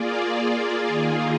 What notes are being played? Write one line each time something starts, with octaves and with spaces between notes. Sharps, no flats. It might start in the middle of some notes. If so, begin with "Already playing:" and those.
Already playing: A#3 F4 G#4 D5
D#3 A#3 F4 G#4